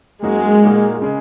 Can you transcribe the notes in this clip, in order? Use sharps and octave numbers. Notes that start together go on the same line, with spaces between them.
F#2 F#3 G#3 A#3 D#4 F#4
A#2 A#3 D#4 F#4
C#3 G#3